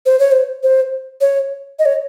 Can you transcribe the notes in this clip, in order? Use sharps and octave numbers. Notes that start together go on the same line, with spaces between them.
C5
C#5
C5
C5
C#5
D#5
C#5